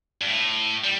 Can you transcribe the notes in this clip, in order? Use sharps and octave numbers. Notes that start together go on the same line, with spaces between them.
G2
A2
G3